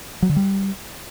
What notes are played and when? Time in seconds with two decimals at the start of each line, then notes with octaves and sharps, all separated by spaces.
0.22 F#3
0.29 D3
0.36 G3